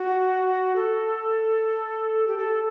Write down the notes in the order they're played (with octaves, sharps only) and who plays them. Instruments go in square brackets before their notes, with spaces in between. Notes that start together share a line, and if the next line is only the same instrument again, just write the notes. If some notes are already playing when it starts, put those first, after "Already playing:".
Already playing: [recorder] F#4
A4
G4
A4